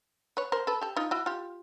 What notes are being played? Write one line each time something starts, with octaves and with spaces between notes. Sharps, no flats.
B4 C#5
A#4 C5
A4 B4
G4 A4
D#4 F4
E4 F#4
F4 G4